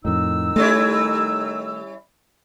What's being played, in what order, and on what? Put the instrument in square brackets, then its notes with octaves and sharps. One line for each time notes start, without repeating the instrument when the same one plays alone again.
[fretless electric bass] F2 A2 [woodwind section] D#3 D#4 E6
[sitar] G3 C#4 E4 [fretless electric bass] A3